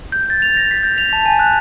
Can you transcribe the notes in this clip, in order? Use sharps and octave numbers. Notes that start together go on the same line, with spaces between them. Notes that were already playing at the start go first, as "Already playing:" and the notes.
G6
A6
F7
A#6
B6
G6
F7
A5
G#5
F#6